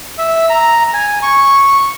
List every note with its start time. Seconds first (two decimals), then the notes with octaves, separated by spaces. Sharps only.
0.18 E5
0.50 A#5
0.94 G#5
1.23 C#6